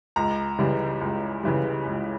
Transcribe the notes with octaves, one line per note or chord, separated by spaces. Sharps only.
C#2 A#5
C#3 E3 G3
C#2
C#3 E3 G3
C#2